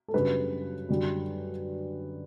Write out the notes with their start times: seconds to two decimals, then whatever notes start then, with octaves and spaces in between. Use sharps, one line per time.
0.08 A4
0.13 F#2 C#3 G3 D4 B4
0.89 F#2 D3 G3